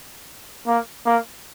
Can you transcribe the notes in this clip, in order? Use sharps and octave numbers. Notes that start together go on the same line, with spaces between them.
A#3
A#3